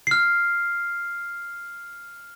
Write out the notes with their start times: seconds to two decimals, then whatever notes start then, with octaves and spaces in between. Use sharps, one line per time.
0.07 F6 C7